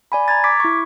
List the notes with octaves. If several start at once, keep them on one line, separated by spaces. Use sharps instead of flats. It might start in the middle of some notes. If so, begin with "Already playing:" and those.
D5 G#5 B5
A#5 G#6 A6
D6 G#6 B6
E4 C#6